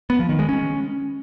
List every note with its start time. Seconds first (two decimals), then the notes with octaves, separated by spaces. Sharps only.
0.10 B3
0.19 F3
0.29 D#3
0.39 G#3
0.49 C#4